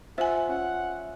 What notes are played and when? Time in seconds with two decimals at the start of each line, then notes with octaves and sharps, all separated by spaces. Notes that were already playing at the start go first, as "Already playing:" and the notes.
0.18 F4 C5 E5 F#5 G#5
0.49 C#4 F4 F#5